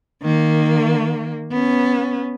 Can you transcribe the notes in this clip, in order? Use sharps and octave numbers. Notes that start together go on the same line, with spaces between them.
D#3 A#3
B3 C#4